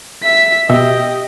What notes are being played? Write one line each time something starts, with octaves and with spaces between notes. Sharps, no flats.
E5 B6
B2 G4 D#5 E5